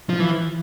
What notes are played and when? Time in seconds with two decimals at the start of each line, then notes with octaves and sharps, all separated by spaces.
0.09 F3
0.20 E3